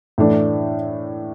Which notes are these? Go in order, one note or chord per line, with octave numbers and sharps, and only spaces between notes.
A2 E3 A3 D4